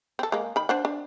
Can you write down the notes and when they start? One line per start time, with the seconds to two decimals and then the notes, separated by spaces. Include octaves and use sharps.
0.19 C4 A4
0.32 G#3 A#3
0.56 D#3 B5
0.69 D4 C5 F#5
0.85 D4